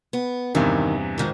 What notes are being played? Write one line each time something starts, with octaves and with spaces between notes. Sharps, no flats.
B3
E2 G2 C3 D#3
G#2 D#3 F3